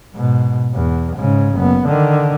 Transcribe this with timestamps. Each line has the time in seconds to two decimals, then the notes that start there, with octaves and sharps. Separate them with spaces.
0.15 G#2 B2
0.74 E2
1.17 G#2 C#3
1.56 F#1 B3
1.86 D3 D#3